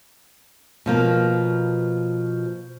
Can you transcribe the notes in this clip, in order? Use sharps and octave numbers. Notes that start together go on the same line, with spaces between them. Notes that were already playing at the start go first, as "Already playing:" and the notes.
B2 F3 A#3